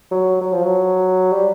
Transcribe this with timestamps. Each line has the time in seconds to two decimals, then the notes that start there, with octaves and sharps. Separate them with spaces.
0.11 F#3
0.41 F#3
0.52 F3
0.63 F#3
1.32 G3